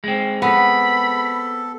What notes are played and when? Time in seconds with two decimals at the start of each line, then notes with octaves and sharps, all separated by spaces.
0.04 G#3 C4
0.42 B3 A4 B5